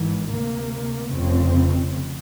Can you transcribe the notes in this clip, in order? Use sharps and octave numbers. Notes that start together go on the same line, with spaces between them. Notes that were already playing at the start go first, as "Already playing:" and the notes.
Already playing: G#1 G#2 E3
D2 C3 A#3
F1 F2 C#3 C4